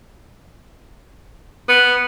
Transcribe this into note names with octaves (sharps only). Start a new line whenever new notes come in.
B3